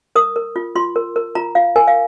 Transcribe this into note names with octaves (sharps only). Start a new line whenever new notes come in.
A#4 D#6
A#4
F4
F4 C6
A#4
A#4
F4 A#5
F4 F5
A#4 G#5
F5